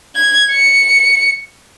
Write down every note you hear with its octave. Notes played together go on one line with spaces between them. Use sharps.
G#6
C#7